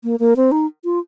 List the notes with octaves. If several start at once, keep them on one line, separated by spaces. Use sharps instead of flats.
A#3
A#3
C4
D#4
F4